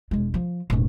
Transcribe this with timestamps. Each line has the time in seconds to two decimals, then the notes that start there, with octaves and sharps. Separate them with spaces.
0.11 E1 G#3
0.34 F3
0.70 E1 A2